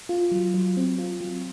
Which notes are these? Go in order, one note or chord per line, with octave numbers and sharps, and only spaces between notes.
F4
F#3
F#3
C4
F4
F#3